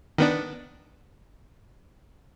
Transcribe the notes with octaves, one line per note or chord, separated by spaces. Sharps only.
D#3 B3 D4